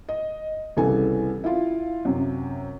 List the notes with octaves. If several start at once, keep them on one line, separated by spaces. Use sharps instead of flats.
D#5
C2 C#3 E3 A4 G#5
E4 F4
F#2 C3